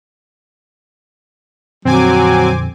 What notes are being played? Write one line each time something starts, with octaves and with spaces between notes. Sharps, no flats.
F2 A#2 D3 F#3 C4 G#5 D6